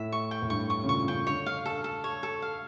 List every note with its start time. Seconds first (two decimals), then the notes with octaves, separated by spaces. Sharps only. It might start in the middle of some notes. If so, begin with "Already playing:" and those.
Already playing: A2 E5
0.12 C#6
0.31 G5
0.42 A2
0.50 G2 C#6
0.70 C#6
0.84 C#3
0.89 A#2 C#6
1.08 C#3 G5
1.27 D3 C#5
1.46 F5
1.66 A4
1.84 A4
2.04 C#5
2.23 A4
2.42 F5